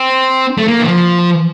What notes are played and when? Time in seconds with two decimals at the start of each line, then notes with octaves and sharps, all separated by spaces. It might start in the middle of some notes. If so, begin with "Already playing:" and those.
Already playing: C4
0.58 A3
0.68 A#3
0.80 E3
0.87 F3